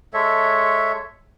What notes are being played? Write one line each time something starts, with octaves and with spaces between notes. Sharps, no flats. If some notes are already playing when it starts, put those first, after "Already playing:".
G#3 A4 C#5 E5